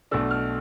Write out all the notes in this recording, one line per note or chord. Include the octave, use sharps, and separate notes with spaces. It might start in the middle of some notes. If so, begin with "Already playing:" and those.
B1 B2 A3 D4 E6
F6